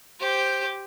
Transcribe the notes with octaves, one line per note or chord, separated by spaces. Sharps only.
G4 C5